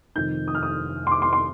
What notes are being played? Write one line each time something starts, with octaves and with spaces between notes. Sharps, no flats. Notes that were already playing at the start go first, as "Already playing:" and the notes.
F1 F2 D#3 G6
D#6
F6
D#6
C6
D6
C6
C6